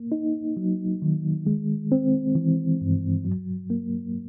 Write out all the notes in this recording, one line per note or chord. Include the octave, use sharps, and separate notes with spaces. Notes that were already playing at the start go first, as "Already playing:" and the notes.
Already playing: A#3
D#4
F#3
D#3
G#3
C4
E3
G2
F#3
A#3